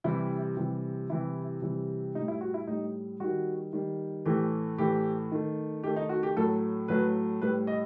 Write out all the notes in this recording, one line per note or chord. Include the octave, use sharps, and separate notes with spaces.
C3 E3 G3 E4
C3 E3 G3
C3 E3 G3 E4
C3 E3 G3
A2 G3 D#4
E4
F#4
E4
A2 G3 D#4
D#3 G3 F#4
D#3 G3
A2 E3 A3 G4
A2 E3 A3 G4
D#3 A3
D#3 A3 G4
D#4
F#4
G4
A2 F#3 A3 A4
A2 F#3 A3 B4
A2 G3 B4
D#5